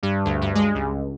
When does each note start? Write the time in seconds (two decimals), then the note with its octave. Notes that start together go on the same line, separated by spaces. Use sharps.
0.03 G2
0.25 D2
0.41 G2
0.55 G#3
0.75 C#2